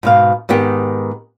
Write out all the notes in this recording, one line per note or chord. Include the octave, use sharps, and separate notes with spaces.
G#2 B2 F5
G#2 D#3 B3 G4